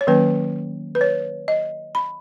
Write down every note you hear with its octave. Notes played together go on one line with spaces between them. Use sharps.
C#5
D#3 F#3 A#3 C#4 B4
B4
C#5
D#5
B5